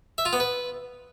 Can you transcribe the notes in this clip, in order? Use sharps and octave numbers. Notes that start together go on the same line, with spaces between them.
E5
F4
B3
B4